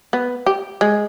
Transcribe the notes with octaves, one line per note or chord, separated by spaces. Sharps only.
B3
G4
G#3